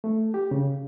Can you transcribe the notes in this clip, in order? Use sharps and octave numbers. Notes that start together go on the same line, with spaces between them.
A3
G4
C#3